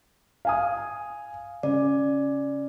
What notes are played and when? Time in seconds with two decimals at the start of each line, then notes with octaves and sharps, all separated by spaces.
0.45 F5 G#5 D#6
1.63 C#3 D5